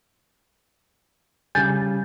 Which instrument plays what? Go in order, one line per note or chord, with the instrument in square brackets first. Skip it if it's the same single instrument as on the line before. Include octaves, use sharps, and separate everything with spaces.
[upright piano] C#3 G3 [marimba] G#5 G6 A6